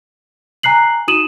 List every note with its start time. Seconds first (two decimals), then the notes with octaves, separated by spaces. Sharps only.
0.63 G#5 A#5 F#6 C7 F#7
1.08 D#4 F#4 D#6 D#7 E7 F#7